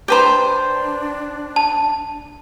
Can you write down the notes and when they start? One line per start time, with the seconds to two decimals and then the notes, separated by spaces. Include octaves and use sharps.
0.08 D4 G4 B4 C5 G5 A#5
1.56 A5